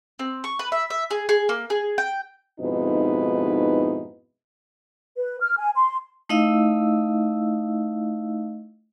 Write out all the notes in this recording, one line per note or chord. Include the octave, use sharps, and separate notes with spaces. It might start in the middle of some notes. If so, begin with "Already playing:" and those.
C4
C#6
B4
E5
E5
G#4
G#4
A#3
G#4
G5
F2 G#2 B2 D#4 E4 B4
B4
F6
G#5
C6
A3 D#4 E4 D#5 F5 E6